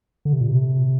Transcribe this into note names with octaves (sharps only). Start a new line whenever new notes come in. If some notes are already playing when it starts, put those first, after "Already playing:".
D3
C3
A#2
C3